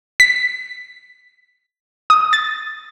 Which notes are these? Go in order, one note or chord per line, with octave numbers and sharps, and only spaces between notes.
B6
D#6
A6